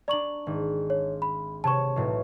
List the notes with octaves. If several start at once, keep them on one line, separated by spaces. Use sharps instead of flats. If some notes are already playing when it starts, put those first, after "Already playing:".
D4 D5 A#5 C#6 F#7
G#1
C#5
B5
C3 C#5 A5 C#6 E7
B1 A2 F#3